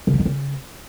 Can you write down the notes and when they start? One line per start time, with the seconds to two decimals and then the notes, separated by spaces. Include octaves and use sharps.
0.07 C#3
0.13 F3
0.19 D#3
0.26 C#3